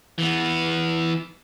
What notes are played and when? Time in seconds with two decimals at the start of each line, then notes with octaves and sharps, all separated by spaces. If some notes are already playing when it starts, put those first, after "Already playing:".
0.18 E3 B3